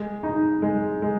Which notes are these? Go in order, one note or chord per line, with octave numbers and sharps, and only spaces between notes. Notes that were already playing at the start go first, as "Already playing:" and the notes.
Already playing: G#3
D#4
G#3
G#3